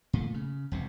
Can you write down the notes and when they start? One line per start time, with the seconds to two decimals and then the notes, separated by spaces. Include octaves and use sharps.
0.13 A#2 A3
0.34 C#3
0.72 E1 C2 C3